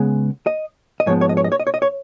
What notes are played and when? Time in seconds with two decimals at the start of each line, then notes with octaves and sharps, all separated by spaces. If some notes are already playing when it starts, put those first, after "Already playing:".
Already playing: C#3 G#3 B3
0.47 D#5
1.00 D#5
1.06 G#2 F3 G#3 B3 C#5
1.21 C#5
1.29 D#5
1.37 C#5
1.44 D#5
1.52 C#5
1.60 D#5
1.67 C#5
1.74 D#5
1.82 C#5